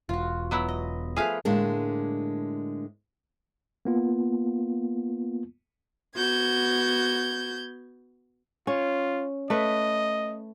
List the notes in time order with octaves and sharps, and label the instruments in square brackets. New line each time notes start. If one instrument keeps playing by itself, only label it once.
[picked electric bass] E1 [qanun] F4 F#4
[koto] F#3 B3 E4
[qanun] D#5
[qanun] F3 A3 B4 [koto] G#4 F5
[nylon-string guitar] A2 D3 G#3 A#3 D4
[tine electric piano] A#3 B3 F4
[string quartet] B3 F#4 G6 G#6
[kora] C#4 [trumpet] F4
[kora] A3 B4 [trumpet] D#5